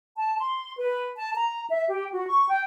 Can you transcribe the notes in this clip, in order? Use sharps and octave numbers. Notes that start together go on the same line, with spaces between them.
A5
C6
B4
A5
A#5
E5
G4
F#4
C#6
G5